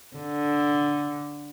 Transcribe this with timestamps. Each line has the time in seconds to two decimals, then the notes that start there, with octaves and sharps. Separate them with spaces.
0.17 D3